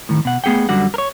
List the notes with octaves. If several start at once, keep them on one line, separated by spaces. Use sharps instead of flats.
A2 D#3
B2 F#5
A3 B3 G#4 F#5 G5
F#2 D3 G3 F#4 F#5
A#4 C#5